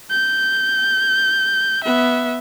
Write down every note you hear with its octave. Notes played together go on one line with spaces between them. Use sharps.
G6
B3 E5